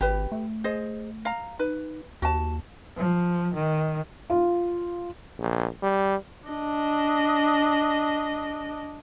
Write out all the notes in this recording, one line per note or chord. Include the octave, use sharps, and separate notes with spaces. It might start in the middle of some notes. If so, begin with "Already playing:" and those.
G#1 G4 B4
A3
G#4 C5 D#5
F5 A#5
D#4 B4
D#2 F#4 A5
F3
D#3
F4
A#1
G3
D4 D#5